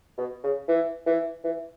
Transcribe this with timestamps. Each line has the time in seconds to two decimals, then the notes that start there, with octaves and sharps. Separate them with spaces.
0.18 B2
0.44 C#3
0.68 E3
1.06 E3
1.44 E3